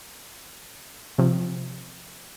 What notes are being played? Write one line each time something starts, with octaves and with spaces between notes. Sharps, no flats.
C3 F3